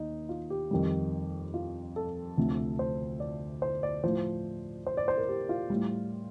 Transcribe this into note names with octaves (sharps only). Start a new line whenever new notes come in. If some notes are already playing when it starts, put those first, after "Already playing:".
Already playing: D#2 D#4
F4
G4
F2 D#3 G3
F4
A4
D2 C3 F3
C5
D5
C5
D5
A2 F3 C5
C5
D5
C5
A#4
G4
F4
A2 G3